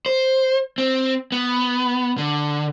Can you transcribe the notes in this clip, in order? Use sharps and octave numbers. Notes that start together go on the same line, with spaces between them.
C5
C4
B3
D3